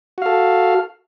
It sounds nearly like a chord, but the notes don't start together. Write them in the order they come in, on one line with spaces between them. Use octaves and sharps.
F#4 F5 A4